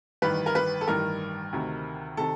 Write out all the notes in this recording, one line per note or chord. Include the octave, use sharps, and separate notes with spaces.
A1 G2 D#3 B4
A#4
B4
A4
A1 G2 D#3 A#4
D2 C3 D#3
C3 D#3 A4